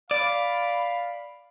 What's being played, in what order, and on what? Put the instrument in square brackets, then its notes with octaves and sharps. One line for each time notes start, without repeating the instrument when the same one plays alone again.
[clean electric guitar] D5 [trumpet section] F5 B5